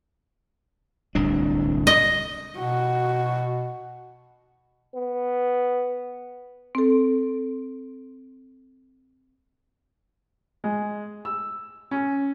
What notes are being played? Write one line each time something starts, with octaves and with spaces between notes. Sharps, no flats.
D1 C2 D4
D#5
B2 F#4
B3
C4 A4
G#3
E6
C#4